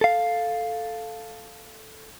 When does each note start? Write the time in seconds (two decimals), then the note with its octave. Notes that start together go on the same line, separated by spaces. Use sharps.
0.01 A4 F5